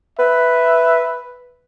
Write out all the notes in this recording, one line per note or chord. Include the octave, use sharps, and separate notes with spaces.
B4 E5